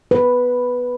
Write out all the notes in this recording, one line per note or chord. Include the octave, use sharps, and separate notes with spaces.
B4